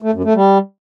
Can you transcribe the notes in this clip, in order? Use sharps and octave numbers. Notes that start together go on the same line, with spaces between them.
A3
F#2
A3
G3